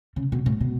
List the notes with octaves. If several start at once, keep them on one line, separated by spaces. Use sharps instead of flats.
C#3
B2
A2
B2